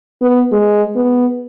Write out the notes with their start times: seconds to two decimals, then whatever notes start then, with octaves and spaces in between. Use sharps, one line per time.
0.22 B3
0.52 G#3
0.96 B3